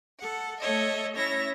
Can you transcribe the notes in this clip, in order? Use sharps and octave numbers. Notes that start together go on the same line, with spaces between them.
A4 F#5
A3 A4 C#5 D#5 E5
C#4 E4 C#5 E5 A#6